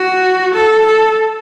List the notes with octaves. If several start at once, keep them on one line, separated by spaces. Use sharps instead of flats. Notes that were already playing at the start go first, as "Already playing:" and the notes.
Already playing: F#4
A4
A4